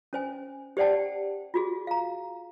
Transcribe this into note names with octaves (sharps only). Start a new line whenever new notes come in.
C#4 C5 G#5
G4 C5 D5 F#5 G5 A5
F4 F#4 G#4
F5 A#5